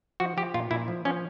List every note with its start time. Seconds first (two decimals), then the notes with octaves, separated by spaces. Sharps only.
0.20 F3 F#4
0.37 F3 G4
0.54 A#2 F4
0.71 A#2 E4
0.88 F3
1.05 F3 C#4